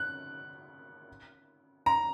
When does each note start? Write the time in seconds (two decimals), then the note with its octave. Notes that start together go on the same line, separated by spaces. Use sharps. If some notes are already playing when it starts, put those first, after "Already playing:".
Already playing: F#6
1.86 A#5